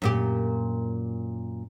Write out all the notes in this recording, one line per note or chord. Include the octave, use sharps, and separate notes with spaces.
F#2 A#2 G4